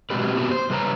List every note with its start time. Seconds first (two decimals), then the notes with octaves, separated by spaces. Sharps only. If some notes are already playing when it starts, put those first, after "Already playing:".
0.10 B2 F#3 G#3 C4 G4 B4
0.35 A#3 B3 F#4 G4
0.51 C5
0.70 C#3 G3 B4 C#5 D#5 A#5